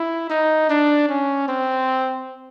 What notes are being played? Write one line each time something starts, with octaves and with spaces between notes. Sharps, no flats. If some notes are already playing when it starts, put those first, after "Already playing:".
Already playing: E4
D#4
D4
C#4
C4